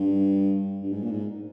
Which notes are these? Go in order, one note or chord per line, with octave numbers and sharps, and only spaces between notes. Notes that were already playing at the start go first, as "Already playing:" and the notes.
Already playing: G2
G2
G#2
A#2
G#2